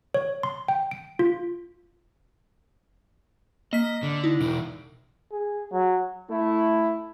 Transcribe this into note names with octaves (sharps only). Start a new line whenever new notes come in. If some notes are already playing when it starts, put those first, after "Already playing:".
C#5
C6
G5
D7
F4
A#3 D#5 B6
D3
D#4 E4
B2 E3 D7
G#4
F#3
A3 E4